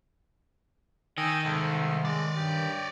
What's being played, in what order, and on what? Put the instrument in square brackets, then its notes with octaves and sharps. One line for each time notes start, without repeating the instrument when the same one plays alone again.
[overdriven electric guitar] D#3 [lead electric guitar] D#5 [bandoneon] G5 G#5 E6
[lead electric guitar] C2 [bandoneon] G#2 A4
[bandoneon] G#3 [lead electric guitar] C#5 D5
[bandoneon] G2 G4